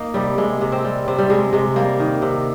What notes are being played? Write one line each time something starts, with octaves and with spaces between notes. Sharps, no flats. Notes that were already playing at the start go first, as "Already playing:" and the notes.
Already playing: A#3 D#4
C3 G3
C3 G#3
C3
C4
G3
C3 C4
G3
C3 G#3
C3 G#3
G3 A#3
D#3
C3